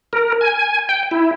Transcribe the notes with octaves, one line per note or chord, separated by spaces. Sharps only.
A#4
G#5
G5
E4